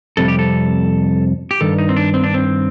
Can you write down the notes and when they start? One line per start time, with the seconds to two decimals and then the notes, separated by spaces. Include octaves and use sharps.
0.17 F2 C3 G3 A4
0.28 G4
0.39 A4
1.51 G4
1.61 G2 D#3 A4
1.78 D#4
1.89 C4
1.97 D4
2.14 C4
2.24 D4
2.34 C4